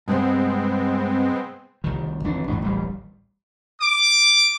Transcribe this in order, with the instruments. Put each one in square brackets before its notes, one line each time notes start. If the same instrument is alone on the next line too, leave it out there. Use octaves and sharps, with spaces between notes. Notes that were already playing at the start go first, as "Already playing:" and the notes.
[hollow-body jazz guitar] G2 C3 [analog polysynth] G#3 B3 C4
[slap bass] C2 D#3
G1 F2 E3 D4
A1 G#2
D1 A1 G3
[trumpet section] D6